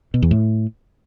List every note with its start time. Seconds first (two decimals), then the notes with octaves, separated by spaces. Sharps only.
0.14 B2
0.22 E2
0.31 A2